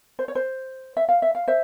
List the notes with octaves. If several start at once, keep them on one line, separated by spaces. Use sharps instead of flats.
C5
C#5
C5
E5
F5
E5
F5
C5 E5